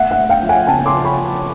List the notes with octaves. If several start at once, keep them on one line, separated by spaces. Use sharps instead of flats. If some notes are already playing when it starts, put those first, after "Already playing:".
Already playing: A3 E5 F#5
E5 F#5
A3
F5 G5
F3
F#5 G#5
C#3 G5 A5
C6 D6
F3
B5 C#6
F3